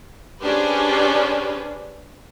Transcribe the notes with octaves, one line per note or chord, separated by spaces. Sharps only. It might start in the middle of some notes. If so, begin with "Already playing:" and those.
C#4 D4 G4 G#4 B4 C5